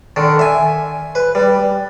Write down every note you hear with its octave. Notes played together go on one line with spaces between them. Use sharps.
D3 D#3
E5 G#5
B4
G3